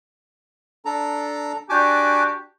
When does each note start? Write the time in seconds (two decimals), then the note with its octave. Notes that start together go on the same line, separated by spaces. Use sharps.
0.85 D4 A4 A#5
1.69 D4 F#4 G4 G#5 A5 D6